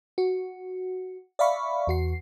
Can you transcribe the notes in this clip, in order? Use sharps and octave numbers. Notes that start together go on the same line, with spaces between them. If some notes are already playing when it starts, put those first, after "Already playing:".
F#4
D5 E5 F5 B5 C#6
E2 F#4 C7